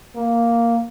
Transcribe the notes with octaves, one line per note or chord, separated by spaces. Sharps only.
A#3